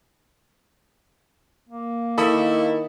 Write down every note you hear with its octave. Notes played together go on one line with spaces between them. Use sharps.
A#3
D#3 E4 A4 B5 D#6